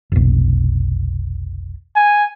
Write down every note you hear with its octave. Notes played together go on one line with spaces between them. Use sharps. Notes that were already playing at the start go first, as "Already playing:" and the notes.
F1 B1
G#5